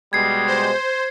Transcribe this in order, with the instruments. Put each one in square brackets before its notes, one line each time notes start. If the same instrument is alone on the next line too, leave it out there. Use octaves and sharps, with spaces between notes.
[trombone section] B2 G3 G#3 [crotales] G#6 C7
[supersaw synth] C5